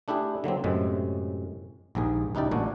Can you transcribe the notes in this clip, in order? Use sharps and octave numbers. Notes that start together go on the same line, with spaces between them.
A3 D4 E4 G4 G#4
D3 F#3 A#3 C4
F#2 A2 C3 G#3
A#1 D#2 G#2 G#4
C#2 D#4 E4 G4 D5
A1 A#2 D4 F#4